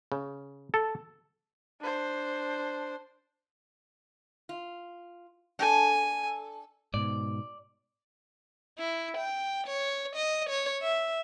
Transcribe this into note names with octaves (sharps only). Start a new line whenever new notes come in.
C#3
A4
D4 C5
F4
D4 A4 G#5
G#2 B2 D5
E4
G5
C#5
D#5
C#5
E5